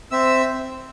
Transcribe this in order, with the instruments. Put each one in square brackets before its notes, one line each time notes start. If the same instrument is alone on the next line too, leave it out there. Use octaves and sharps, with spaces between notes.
[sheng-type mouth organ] C4 E5 E6